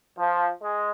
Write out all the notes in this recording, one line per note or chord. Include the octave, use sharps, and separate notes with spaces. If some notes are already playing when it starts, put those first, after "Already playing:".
F3
G#3